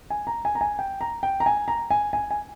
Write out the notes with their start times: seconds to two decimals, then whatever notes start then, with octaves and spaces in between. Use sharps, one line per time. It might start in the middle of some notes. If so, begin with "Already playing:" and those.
0.10 G#5
0.27 A#5
0.45 G#5
0.55 A#5
0.61 G#5
0.79 G5
1.01 A#5
1.23 G5
1.40 A#5
1.46 G#5
1.68 A#5
1.91 G#5
2.13 G#5
2.31 G#5